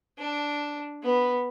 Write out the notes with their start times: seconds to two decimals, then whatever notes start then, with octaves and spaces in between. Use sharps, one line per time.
0.18 D4
1.03 B3